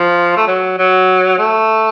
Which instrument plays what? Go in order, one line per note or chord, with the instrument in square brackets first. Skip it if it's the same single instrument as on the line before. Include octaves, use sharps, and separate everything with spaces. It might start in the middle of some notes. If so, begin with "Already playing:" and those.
Already playing: [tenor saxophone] F3
A3
F#3
F#3
A3